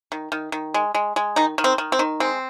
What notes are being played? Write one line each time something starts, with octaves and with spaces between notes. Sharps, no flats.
D#3
D#3
D#3
G#3
G#3
G#3
D#3 D#4
D#3
C4
D#3
C4
D#3
G#3 C4